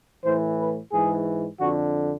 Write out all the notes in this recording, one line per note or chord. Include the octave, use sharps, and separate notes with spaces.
A2 E3 C5
B4
G#2 E3 G#4
F2 D3 F#4